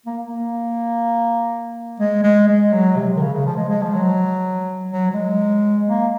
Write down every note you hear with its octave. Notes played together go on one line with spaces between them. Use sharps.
A#3
A#3
G#3
G#3
G#3
F#3
C3
D#3
C#3
C#3
F3
G#3
G#3
F3
F#3
F#3
F#3
G#3
A#3